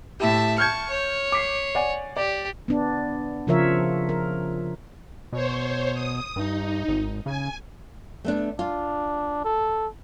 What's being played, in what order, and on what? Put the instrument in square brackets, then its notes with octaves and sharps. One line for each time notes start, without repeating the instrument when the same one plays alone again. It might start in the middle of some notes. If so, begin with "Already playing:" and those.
[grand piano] A2 E4 G4 [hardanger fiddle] E5 A5
[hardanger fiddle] A5 C#6 [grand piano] F6 G6 G#6
[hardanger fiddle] C#5
[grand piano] D6 B6 C7
D5 F#5 G#5
[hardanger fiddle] G4 [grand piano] D5
[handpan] B3 D4
C#3 F3 F4 A#4 C#5 E5
A#4
[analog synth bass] B2 [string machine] C5 C#5
[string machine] D#6
[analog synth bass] G2 [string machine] D#4
[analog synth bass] G#1
[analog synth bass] C#3 [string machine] G#5
[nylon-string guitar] A3 B3 D4
[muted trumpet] D4 [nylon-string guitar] F4
[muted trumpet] A4